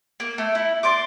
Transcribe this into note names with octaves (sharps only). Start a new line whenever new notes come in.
A#3
A3
E4
D5 C6 D6